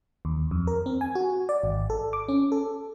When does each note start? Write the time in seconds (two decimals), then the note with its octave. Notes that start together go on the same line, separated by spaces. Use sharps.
0.25 D#2
0.51 F2
0.67 A#4
0.86 C4
1.01 G#5
1.15 F#4
1.49 D5
1.64 G#1
1.90 A4
2.13 D6
2.28 C#4
2.52 A4